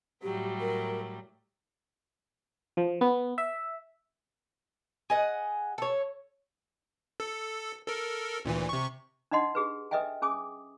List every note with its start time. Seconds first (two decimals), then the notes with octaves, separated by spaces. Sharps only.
0.23 A2 F#3 G3 G4
0.60 A#4
2.77 F3
3.01 B3
3.38 E5
5.10 G#4 D#5 F#5
5.78 A4 C#5
7.20 A4
7.87 A4 A#4
8.45 D2 A#2 E3
8.69 C3 C#6
9.31 D4 D#4 D#5 F#5 C6
9.55 G4 G#4 B4
9.91 A4 B4 D#5 E5 G5 G#5
10.22 C#4 G#4 G#5 D6 D#6